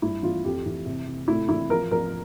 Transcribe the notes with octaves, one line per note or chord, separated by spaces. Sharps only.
G2 E4
E3 F4
F2 G4
E3
C3
C3
A2 E4
E3 E4
F3 A#4
F3 A#4